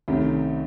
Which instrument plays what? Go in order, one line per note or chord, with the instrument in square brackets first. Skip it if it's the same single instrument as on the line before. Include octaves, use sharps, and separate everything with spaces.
[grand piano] C2 C3 D#3 A3 C#4